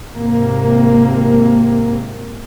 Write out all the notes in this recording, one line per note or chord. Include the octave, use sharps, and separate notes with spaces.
G#1 C3 A#3